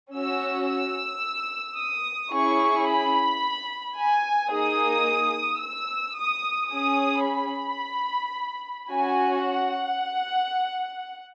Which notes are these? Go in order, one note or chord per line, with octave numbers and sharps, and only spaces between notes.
C#4 F#4 E6
E6
D#6
C#4 E4 G#4 C#6
B5
G#5
A#3 D#4 G#4 D#6
E6
D#6
C#4 G#4 D#6
B5
C#4 F#4 G#5
F#5